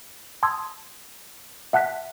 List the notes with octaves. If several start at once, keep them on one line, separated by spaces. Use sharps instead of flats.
A5 C6 D#6 E6 G#6
E5 F#5 A5 F#6 B6